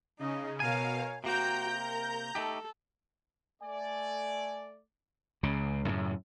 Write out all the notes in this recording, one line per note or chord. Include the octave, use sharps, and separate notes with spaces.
C#3 D#4 D#5
B2 A#4 C#5 F5 G#5
C3 A#3 C4 F#4 G5 A#5 G6
A#4
A3 D#4 G4 A4
A3 D5 G#5
C#2 C#3
F#2 A2 C#3